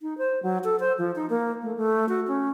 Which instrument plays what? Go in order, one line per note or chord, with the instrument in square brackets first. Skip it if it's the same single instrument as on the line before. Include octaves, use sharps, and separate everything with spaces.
[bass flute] D#4
C5
F#3
A4
C5
F3
D#4
A#3
A3
A3
F#4
C#4